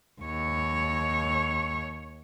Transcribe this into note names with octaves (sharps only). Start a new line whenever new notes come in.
D#2 C#5